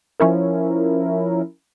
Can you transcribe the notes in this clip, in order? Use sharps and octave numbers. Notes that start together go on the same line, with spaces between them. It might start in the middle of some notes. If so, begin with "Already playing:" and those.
F3 C#4 E4 A#4